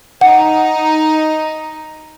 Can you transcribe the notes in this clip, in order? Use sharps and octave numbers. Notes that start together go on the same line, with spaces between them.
D#4 F#5